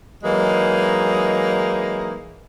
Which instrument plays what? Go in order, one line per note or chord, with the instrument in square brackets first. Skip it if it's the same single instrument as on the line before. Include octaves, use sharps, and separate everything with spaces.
[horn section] E3 F#3 G#3 A#3 D#4